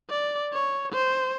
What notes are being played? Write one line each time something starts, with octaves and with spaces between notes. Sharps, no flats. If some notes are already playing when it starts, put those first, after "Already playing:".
D5
C#5
C5